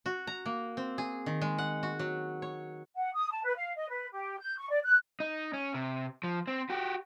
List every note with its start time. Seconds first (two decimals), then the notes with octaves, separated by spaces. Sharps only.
0.06 F#4
0.27 A#5
0.46 A#3
0.77 C4
0.98 G#4
1.26 D#3
1.42 G#3
1.58 F#5
1.83 F#4
1.99 F#3
2.42 C#5
2.96 F#5
3.13 D#6
3.31 A5
3.44 B4
3.56 F5
3.75 D#5
3.89 B4
4.12 G4
4.39 G6
4.57 C#6
4.70 D5
4.83 F#6
5.20 D#4
5.54 C#4
5.74 C3
6.24 F3
6.47 C4
6.70 F#4 G4